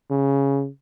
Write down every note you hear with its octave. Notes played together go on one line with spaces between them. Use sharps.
C#3